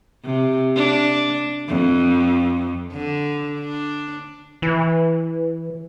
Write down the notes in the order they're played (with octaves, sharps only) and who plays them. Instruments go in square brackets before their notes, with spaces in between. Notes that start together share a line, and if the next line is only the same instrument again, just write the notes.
[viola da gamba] C3
D4
F2
D3
D4
[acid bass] E3